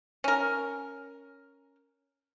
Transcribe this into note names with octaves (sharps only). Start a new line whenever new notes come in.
C#4 A#4